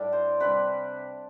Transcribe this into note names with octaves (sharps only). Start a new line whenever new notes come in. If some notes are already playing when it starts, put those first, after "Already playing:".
Already playing: A2 G3 D4 D5
C5
C3 G3 D4 B4